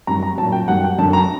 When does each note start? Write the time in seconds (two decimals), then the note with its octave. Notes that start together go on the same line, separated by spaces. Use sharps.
0.07 F#2 D#3 G3 A#5
0.23 A#5
0.38 F#3 A5
0.42 A#2
0.52 G5
0.68 F#2 D#3 G3 F#5
0.84 G5
0.98 F#2 D3 F#3 A5
1.13 A#5